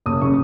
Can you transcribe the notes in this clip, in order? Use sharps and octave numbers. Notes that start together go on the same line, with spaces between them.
F#1 D#6
C#3 C#6